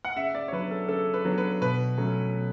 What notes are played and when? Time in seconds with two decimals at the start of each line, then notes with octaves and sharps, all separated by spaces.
0.05 F#5
0.16 C#3 E5
0.35 D5
0.48 C#5
0.52 F#3 B3 D4 B4
0.71 A4
0.89 C#3 A4
1.14 B4
1.25 F#3 B3 D4
1.38 B4
1.61 B2 B4
1.98 F#3 A3 C#4
2.34 B2